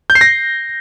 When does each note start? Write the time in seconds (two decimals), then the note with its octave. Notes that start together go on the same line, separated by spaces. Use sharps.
0.10 G6
0.15 C7
0.21 A#6